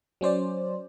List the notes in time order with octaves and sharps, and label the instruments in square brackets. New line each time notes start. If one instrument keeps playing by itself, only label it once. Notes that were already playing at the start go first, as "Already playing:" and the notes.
[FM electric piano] F#3 C#4 C5 D5